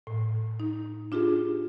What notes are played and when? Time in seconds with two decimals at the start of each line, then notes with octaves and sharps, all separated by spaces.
0.07 A2
0.60 D#4
1.12 D4 F4 G4 G#4